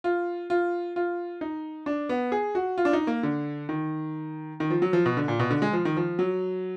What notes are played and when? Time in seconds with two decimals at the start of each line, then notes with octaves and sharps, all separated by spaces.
0.04 F4
0.50 F4
0.96 F4
1.41 D#4
1.86 D4
2.09 B3
2.32 G#4
2.55 F#4
2.78 F4
2.85 D4
2.93 D#4
3.07 A#3
3.23 D3
3.69 D#3
4.60 D#3
4.70 F3
4.82 F#3
4.93 F3
5.06 B2
5.17 D3
5.28 A#2
5.40 B2
5.51 D3
5.62 G#3
5.73 F3
5.85 D#3
5.97 F3
6.19 F#3